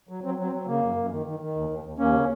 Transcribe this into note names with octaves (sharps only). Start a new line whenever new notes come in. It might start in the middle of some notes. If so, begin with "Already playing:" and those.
F#3
F#3 C4
F#3
C4
F#3
C#3 A#3
F#2
F#2
D#3
D#3
D#3
D#2
D#2
D#2
D#2 A#3 C#4
C#3